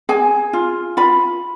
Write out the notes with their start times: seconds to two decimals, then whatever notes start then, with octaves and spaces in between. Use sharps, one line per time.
0.09 G#4 G#5
0.53 F4
0.97 F4 B5